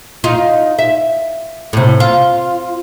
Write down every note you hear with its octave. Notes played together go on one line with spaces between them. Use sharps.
D#4 F4
E5
A2 C3
F4